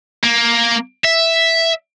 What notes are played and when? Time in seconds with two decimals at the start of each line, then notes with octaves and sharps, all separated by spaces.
0.24 A#3
1.04 E5